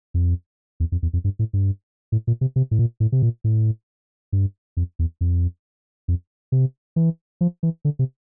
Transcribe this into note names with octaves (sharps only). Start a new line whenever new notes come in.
F2
E2
F2
E2
F2
G2
A2
G2
A2
A#2
C3
C3
A2
A#2
A2
C3
A#2
A2
G2
F2
E2
F2
F2
C3
E3
F3
E3
D3
C3